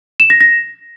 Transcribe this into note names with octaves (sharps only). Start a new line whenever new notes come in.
E7
A#6
A#6